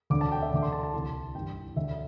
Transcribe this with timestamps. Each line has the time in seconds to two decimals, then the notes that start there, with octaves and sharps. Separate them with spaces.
0.10 D2 D3 D6
0.21 A5
0.32 G5
0.42 E5
0.52 D2 D3 D6
0.62 C6
0.72 A5
0.83 A5
0.93 C2 C3 E3 C6
1.35 G2 E3 G5
1.76 D2 D3 E5